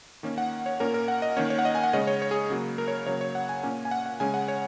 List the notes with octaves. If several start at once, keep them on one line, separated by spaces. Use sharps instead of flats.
D#3 A#3 C#4
F#5
C#5
A#2 A#3 C#4 A#4
A#4
F#5
D#5
D#3 A#3 C#4 C#5
C#5
F#5
D#5
G#5
F#5
C#3 G#3 C#4 D#5
C#5
C#5
G#4
C#3 F#3 A#3
A#4
C#5
C#3 F#3 A#3 C#5
C#5
F#5
G#5
A#2 A#3 C#4 G#5
G#5
F#5
F#5
C#3 G#3 C#4 G#5
F#5
C#5